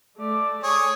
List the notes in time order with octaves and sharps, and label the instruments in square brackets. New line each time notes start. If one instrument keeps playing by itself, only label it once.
[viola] A3 D5
[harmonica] G#4 C#5 [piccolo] D#6